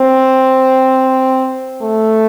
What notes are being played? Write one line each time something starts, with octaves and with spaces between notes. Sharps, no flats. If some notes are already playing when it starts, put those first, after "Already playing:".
Already playing: C4
A3